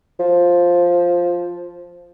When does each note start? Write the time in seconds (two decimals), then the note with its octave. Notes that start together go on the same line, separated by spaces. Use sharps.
0.19 F3